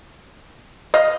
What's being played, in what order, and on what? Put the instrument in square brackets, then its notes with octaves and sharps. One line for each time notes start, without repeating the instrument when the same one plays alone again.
[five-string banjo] D#5 F5